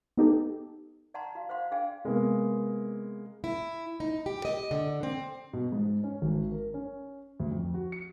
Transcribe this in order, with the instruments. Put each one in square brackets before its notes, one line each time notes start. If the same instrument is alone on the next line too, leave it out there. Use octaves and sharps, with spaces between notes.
[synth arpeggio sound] B3 D#4 G4 A4
[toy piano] D5 F#5 A5 A#5 C6
F#4 F5
F#4 C5 F5 F#5 C6
D4 G#4 D5 F5 G5 G#5
[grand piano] C3 G#3 A#3 B3
[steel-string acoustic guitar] E4
D#4
G4
D#5
D3
C4
[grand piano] B2
G#2
C#4
G#1
A#4
C#4
D2
F2
F#4
C#7